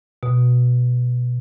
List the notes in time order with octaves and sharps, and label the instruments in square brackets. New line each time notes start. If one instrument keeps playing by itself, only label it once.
[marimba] B2